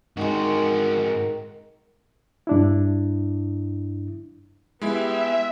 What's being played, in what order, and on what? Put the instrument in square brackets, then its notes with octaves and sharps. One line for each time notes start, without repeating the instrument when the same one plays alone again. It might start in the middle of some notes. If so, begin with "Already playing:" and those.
[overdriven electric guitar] G#2 F#4 [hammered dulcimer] D#3 G#3
[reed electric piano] G2 D4 E4
[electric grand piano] G#3 E4 [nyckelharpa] B3 G4 [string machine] E5